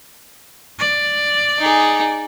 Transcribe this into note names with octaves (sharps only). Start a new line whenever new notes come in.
D5
D#4 G#4